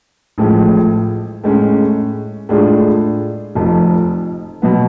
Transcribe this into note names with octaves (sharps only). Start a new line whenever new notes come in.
A1 A2 F3 G#3
A2 G#3 C#4
A2 G#3 D4 F4 G#4
F1 F2 F3
B2 F#3 B3